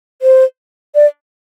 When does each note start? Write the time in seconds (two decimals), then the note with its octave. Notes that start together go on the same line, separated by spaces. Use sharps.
0.22 C5
0.95 D5